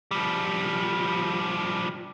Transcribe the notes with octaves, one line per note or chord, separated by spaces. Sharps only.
F3 G3